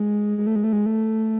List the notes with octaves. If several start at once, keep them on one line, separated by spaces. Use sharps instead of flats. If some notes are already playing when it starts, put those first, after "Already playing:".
Already playing: G#3
G#3
A3
G#3
A3
G#3
A3